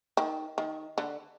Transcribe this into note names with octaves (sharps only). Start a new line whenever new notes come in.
D#3
D#3
D3